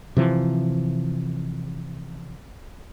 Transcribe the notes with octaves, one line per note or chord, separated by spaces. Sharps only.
C3 E3 F3